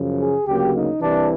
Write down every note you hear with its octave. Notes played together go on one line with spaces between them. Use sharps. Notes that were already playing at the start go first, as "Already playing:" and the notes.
Already playing: F#2 C#3 F3
G#4
D2 C#3 F#3 A#3 G4
D#4
C2 C3 E3 D4